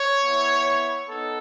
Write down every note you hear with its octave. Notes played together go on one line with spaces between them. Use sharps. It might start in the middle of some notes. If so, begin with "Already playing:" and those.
Already playing: C#5
B3 E4
B3 D#4 A4